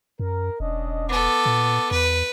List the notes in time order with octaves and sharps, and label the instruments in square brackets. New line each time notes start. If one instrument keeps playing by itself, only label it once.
[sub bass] F#2 [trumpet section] A#4
[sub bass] E1 [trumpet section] C#4 D4 D#5
[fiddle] B3 A4 [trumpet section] D6
[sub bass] A#2
[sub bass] E2 [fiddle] B4